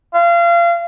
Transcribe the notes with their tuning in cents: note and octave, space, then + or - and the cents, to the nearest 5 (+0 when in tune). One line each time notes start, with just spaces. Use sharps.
F5 -30